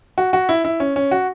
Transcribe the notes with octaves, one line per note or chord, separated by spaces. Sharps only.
F#4
F#4
E4
E4
C#4
C#4
F#4